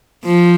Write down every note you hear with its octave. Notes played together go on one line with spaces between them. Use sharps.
F3